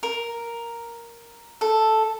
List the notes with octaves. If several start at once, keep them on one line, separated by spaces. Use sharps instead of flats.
A#4
A4